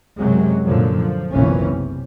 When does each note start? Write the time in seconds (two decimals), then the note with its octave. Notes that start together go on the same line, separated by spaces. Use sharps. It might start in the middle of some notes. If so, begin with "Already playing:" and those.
0.18 F#2 C3 F#3 G#3
0.66 F#2 A#2 D3 F3 F#3
0.95 F3
1.33 F#1 B1 A#2 E3 C4 C#4
1.70 C3